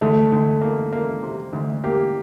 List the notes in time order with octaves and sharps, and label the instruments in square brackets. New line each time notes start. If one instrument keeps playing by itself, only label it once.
[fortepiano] D2 [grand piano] A3
[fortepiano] D2
A#3
A#3
C3
D2
[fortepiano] A#3 [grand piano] G4